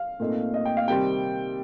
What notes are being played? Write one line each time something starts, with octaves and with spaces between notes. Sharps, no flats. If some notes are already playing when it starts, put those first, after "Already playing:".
Already playing: F5
A#2 A3 C4 D#4
D#5
G5
F5
C3 D#3 G3 C4 G5